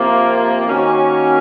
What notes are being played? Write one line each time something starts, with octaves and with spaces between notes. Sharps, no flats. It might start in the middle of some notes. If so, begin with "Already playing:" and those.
Already playing: C3 F3 A#3
D#3 A#3 C#4 F#4